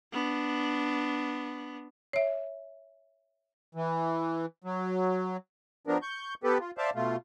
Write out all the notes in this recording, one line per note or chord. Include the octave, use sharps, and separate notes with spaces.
B3 D4
C#5 E5
E3
F#3
F3 B3 D4 A#4
C#6 G6
B3 G4 A4 B4
F4
C5 D5 E5 F5 A5
B2 A3 F4